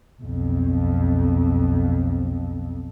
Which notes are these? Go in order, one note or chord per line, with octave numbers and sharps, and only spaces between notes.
B1 F2